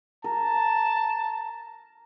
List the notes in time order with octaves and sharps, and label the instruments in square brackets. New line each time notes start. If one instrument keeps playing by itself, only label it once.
[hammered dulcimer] A#4 [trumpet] A5